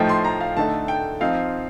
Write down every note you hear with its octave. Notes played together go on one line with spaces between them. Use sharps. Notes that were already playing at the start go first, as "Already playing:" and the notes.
Already playing: A2 F3 A3 D#4 G5
C6
A#5
F5
D3 A3 D#4 A5
G5
F3 C4 D#4 F5